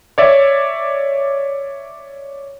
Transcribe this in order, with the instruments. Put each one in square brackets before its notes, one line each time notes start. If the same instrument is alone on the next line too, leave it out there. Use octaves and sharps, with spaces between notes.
[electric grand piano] C#5 D5 E5